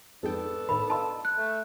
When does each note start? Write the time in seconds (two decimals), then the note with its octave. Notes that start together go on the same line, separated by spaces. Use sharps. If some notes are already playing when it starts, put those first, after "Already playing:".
0.23 F2 G#2 B3 D4 A4 G5
0.69 A2 D#3 B5
0.90 D#4 F4 A5
1.25 F#6
1.36 A3